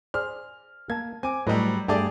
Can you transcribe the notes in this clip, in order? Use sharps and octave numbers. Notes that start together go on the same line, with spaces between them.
G#4 C5 D5 F6
A#3 A5 G#6
C4 G#5 D6
A2 F#3 G3 B4 D#5
G2 A3 G4 G#4 D5 A5